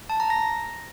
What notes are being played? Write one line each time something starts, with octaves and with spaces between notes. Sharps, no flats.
A5
A#5
A#6